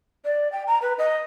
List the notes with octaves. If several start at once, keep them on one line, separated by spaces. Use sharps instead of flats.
D5
G5
A#5
B4
D#5